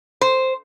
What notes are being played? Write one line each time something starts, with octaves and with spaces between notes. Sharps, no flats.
C5